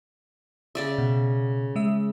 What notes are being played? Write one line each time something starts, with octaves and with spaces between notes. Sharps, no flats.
C#3 D5 E5
B2
G#3 E5